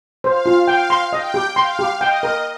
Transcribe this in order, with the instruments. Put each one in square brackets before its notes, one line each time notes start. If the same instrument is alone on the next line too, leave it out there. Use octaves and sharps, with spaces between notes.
[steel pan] C5 [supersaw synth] F5
[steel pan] F4
[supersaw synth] F5 [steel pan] G5
[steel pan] C6
[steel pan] D#5 [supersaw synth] G5
[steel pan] G4
[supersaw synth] F5 [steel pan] C6
[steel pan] G4
[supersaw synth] D#5 [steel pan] G5
[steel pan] A#4